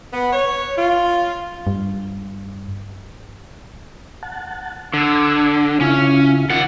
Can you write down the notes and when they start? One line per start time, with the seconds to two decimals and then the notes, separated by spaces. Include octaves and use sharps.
0.13 B3
0.33 C#5
0.78 F4
1.67 G2
4.23 F#5 A5
4.94 D3 E6 G#6
5.81 C#3 C#4 E4 F4
6.50 D#3 F4 F#5 A6